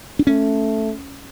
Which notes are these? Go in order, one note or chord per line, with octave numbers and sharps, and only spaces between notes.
D4
A3 C#4